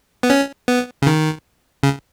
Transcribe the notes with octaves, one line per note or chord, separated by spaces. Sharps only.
B3
C#4
B3
C#3
D#3
C#3